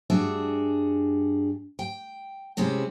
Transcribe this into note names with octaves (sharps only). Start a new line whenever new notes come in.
G2 D4 F#4 G#4 E5
G5
C3 G#3 C4 C#4 E4